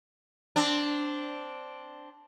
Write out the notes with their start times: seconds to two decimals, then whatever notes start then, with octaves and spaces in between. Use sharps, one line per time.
0.56 C4 D4